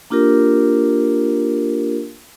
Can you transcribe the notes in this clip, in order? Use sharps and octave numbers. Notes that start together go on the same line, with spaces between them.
A#3 D4 F4 G4 A#4